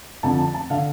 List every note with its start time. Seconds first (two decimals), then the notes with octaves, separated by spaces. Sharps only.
0.23 F2 D3 A5
0.39 A5
0.54 A5
0.70 D3 F5